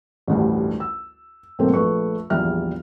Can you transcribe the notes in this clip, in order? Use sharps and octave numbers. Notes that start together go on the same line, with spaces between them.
A1 D2 G2
E6
B1 G#2 A3 A#3 C4
A#1 A3 B4 C#6
A#1 E2 G3 E5 F6